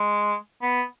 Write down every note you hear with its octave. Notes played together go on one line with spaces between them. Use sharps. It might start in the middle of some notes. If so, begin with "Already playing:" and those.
Already playing: G#3
B3